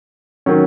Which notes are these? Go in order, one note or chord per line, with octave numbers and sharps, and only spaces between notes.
D#3 F#3 C#4